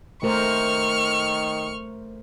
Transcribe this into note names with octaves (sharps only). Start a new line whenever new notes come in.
D#3 A3 A#4 C5 C#6 F6